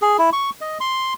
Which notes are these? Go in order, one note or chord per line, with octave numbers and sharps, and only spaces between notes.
G#4
E4
C#6
D#5
C6